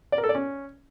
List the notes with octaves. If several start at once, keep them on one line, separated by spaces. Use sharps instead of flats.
D5
A#4
A4
D5
C#4